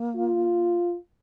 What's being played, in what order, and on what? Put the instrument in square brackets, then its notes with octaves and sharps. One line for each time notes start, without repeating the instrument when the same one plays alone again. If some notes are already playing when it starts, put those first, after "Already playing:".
Already playing: [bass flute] A#3
[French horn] F4